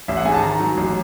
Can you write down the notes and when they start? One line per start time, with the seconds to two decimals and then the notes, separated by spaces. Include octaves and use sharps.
0.08 A1 E5
0.17 F#5
0.25 G#2 G#5
0.34 A5
0.42 D#3 A#5
0.60 F#3
0.77 A1